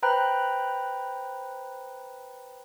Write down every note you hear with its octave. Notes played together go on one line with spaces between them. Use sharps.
B4 C5 G5 A#5 B5 F#6